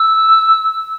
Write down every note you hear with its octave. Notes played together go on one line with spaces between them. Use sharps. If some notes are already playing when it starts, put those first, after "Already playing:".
Already playing: E6